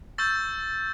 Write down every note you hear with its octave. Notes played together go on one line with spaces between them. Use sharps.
C#6 E6 G6 A6